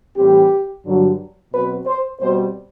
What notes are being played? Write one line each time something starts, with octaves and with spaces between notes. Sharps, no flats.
A2 E3 G3 C4 G4
G2 D3 F#3
B2 F#3 C4 B4
C5
B2 G3 C4 C5